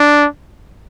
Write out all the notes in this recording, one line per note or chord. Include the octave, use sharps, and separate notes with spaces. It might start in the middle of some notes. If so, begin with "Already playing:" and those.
Already playing: D4